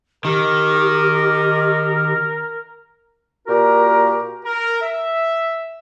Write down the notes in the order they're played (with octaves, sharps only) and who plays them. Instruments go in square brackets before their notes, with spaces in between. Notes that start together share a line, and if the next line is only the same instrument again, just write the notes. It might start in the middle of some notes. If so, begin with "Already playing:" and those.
[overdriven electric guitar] D#3 [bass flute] G4 [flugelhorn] A#4
[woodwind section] A#2 F#4 G4 A#4
[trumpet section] A#4
E5